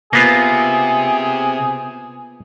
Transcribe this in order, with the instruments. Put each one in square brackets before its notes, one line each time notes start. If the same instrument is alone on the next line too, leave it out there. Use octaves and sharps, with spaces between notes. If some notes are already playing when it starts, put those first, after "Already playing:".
[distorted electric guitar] C3 [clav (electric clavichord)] A#3 B3 F4 [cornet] G#4